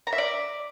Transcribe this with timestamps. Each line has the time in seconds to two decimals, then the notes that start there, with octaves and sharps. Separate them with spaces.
0.07 A#5
0.13 E5
0.18 D5